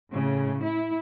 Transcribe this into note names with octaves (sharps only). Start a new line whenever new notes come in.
A2 C#3
E4